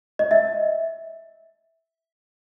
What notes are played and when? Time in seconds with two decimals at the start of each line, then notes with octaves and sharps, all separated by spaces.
0.19 D#5
0.31 E5